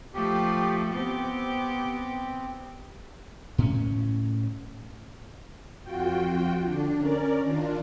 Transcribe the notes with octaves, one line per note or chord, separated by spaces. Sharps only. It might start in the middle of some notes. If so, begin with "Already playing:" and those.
F3 A3 G4
B3 C4 G4
A2 C#4
F2 F4 F#4 G5
D3 D4
C#4 A#4 D5
D#3 D4 F4